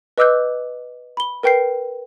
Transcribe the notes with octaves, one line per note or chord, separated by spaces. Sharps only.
B4 D#5 D6 E6 F#6 G6
B5 G7
A#4 B4 G5 G6 C7